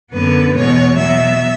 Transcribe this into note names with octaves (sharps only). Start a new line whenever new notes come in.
F#2 D3 F#3 B3 B4
E2 B2 G#3 B3 C#5
B2 F#3 B3 E5